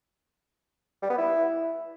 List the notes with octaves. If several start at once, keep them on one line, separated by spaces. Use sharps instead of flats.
G3
B3
E4